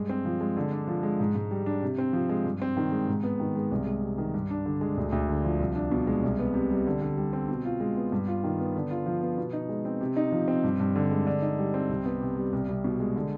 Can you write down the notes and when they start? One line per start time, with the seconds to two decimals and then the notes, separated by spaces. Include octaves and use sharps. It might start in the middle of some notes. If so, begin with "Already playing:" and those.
Already playing: G2 G#3
0.09 C4
0.25 F3
0.41 G#3
0.57 D3
0.72 D4
0.87 F3
1.03 G#3
1.20 G#2
1.35 G#2
1.51 G3
1.66 D4
1.83 C3
1.98 C4
2.13 F3
2.29 G#3
2.45 G2
2.62 C4
2.77 D#3
2.92 G#3
3.08 G#2
3.23 B3
3.40 D#3
3.55 G#3
3.72 C2
3.87 G#3
4.02 C3
4.18 D#3
4.34 G2
4.50 D4
4.66 D3
4.81 G#3
4.97 D2
5.12 D2
5.28 D3
5.44 F3
5.60 C2
5.75 D4
5.92 B2
6.07 G#3
6.23 C2
6.39 B3
6.54 C3
6.71 G3
6.87 D3
7.01 D3
7.17 G3
7.33 C4
7.49 B2
7.65 F4
7.80 G#3
7.96 B3
8.12 G2
8.28 F4
8.44 D#3
8.60 B3
8.75 D3
8.91 F4
9.06 F3
9.22 B3
9.38 B2
9.53 D#4
9.69 G#3
9.85 C4
10.01 C3
10.17 D#4
10.32 F3
10.48 C4
10.64 G2
10.80 G2
10.96 D3
11.11 G#3
11.27 D3
11.42 D#4
11.58 G3
11.74 C4
11.89 C2
12.05 B3
12.21 C3
12.36 G3
12.53 C2
12.69 C2
12.84 B2
13.00 G#3
13.16 D3